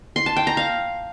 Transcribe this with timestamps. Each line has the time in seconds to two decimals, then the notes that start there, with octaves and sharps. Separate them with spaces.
0.16 C6
0.26 A5
0.37 G5
0.47 A#5
0.57 F5